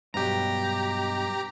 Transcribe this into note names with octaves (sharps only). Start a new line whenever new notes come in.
G2 B2 F#3 G4 A#5